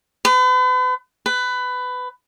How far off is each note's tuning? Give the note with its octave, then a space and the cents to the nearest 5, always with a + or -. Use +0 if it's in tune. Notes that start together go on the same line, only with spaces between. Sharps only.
B4 +40
B4 +20